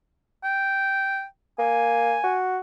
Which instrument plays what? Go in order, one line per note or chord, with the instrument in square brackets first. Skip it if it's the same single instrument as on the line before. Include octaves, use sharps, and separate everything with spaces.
[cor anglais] G5
[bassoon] A#3 [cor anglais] G#5
[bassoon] F#4